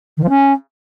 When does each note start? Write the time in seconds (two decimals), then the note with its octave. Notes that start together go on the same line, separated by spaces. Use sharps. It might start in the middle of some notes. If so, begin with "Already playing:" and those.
0.17 D#3
0.23 F3
0.29 C#4